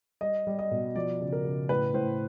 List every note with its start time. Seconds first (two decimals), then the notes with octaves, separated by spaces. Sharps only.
0.21 G3 D#5
0.47 G3
0.59 D#5
0.71 B2
0.96 F3 D5
1.21 C#3
1.32 A#4
1.45 C#3
1.69 A2 B4
1.94 A2 C5